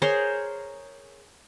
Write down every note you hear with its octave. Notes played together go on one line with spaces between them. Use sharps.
G#4 A#4 C5 C#5